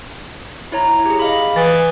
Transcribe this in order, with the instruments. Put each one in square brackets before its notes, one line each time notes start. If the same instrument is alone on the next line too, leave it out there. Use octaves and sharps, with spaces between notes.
[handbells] E4 C#5 A#5
G4 G#4
D#5 F5 B5
[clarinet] E3 [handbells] D#6 A6